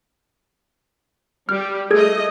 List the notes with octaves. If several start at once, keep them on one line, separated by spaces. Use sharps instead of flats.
G3 G4 F6
A3 G#4 A4 D#5 G#6